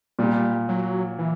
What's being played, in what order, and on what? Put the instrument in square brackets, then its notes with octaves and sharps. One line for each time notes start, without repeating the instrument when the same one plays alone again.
[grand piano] A#2 [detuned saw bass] G3
[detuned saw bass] F#3
E3